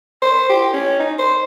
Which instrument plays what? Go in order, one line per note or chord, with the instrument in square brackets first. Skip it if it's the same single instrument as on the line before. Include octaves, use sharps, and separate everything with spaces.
[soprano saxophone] C5
G4
C#4
D#4
C5